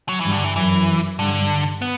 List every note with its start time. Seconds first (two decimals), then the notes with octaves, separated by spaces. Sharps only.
0.09 F#3
0.20 G2 E3
0.31 D3
0.44 E3
0.55 F#2 E3
1.19 G2 D3
1.82 B3